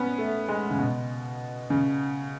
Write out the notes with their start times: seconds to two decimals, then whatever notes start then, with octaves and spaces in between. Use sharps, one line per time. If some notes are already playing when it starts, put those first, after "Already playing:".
Already playing: B3 C#4
0.18 A3
0.49 G#3
0.70 C#3
0.79 B2
1.70 C#3